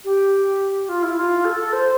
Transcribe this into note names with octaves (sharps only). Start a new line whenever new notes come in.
G4
F4
E4
F4
A4
C5